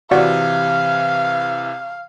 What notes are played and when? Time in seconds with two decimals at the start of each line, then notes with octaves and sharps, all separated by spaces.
0.11 C3 E3 F#4 D5 F5 F#5